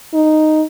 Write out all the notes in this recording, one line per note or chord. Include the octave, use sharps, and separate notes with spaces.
D#4